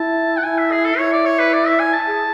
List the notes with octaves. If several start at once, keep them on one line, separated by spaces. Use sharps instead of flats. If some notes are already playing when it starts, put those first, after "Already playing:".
Already playing: E4 A5
F#5
E4 G#5
E5
G#4
A4
E4 C#5
D5
C#5
B4
D5
E5
G#5
A5
G#4